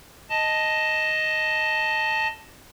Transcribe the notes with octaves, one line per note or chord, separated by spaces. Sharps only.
D#5 A5